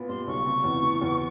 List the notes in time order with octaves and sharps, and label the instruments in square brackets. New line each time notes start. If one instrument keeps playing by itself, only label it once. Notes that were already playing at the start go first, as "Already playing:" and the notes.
Already playing: [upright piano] A#2 B3
[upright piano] G3 [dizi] C6
[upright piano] B1 [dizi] C#6
[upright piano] C3
E2
E3
E2